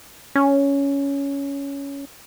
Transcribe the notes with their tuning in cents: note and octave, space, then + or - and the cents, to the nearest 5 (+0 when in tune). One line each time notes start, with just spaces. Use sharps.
C#4 +10